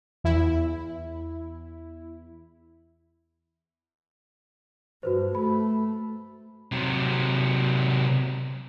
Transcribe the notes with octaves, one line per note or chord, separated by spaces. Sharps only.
E2 E4
G2 F#4 B4 C5
A3 B5
C3 F#3